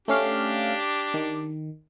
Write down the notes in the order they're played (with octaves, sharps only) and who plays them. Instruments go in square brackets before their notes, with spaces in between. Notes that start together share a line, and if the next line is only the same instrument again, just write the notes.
[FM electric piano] A3 C#4 F5 [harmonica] D4 G4
[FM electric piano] D#3